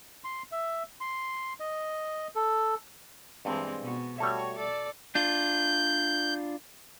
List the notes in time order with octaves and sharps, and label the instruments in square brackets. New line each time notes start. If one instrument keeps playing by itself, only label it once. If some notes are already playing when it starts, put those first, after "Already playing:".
[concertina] C6
E5
C6
D#5
A4
[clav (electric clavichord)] G2 [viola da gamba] E3 G#3 C4
[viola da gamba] B2 B3 F#4
[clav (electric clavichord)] G3 A3 E5 [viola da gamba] F#4 C#5
[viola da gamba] A4 D5
[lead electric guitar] D4 F4 [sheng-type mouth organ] G6